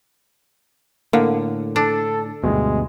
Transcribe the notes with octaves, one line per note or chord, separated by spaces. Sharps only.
A2 D3 A#3 F5 F#5
D4 A4
D2 G2 B2 G#3